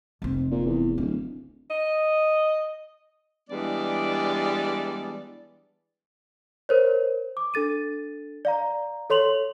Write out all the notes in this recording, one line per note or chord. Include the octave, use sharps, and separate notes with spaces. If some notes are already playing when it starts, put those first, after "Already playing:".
F1 C4
A#2
E2
D1 C#4
D#5
E3 G3 G#3 B3 D4 D5
A#4 C5 C#5
D6
D4 A4 A6 D#7
D5 F5 A#5
A4 C#5 C6 F7 F#7